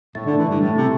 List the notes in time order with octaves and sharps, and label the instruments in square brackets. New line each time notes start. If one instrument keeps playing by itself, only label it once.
[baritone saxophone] A2 [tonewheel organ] A3
[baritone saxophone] D3
E3
G2
A2
C3